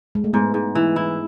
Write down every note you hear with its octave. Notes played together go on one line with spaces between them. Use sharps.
G#3
A3
G#2 B3
G#2
E3
E4